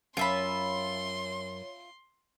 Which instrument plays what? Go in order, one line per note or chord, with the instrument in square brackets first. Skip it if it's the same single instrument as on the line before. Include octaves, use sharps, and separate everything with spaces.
[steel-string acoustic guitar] F#2 [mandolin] F4 E5 B5 [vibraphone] C#5 [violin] C6